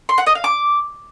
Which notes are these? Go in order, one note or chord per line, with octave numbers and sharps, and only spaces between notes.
C6
F#5
D#5
F5
D6